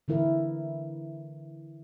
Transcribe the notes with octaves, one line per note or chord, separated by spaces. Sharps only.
D3 E3 E4 A#4